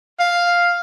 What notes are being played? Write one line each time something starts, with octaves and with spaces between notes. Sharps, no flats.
F5